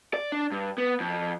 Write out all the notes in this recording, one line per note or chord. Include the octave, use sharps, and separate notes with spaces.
D5
D4
G2
B3
F2